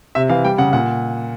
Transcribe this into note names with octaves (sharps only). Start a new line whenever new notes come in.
C3 E5
E3 F5
G3 G5
C#3 F#5
A#2 F#5